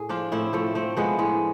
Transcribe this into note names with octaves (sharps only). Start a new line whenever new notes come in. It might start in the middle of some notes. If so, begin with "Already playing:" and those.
Already playing: A2 G#4
F3 D4 F4
A2 C4 E4
F3 A3 C4
F3 A3 C4
F3 G#3 B3
A2 G#3